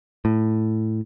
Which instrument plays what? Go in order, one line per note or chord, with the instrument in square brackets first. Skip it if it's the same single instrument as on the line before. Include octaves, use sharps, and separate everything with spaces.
[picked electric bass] A2